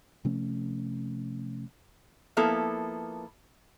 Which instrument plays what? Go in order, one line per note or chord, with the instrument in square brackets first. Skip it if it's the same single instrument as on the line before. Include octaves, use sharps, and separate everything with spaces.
[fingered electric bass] C3 F3 A3 C#4
[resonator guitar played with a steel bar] F3 A#3 B3 E4 A4